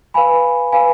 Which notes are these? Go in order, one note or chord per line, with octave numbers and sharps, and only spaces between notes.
B4 F5 G#5 B5
B4 F5 G#5 B5